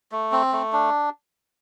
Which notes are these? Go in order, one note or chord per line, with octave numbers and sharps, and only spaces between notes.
A3
C4
A3
D4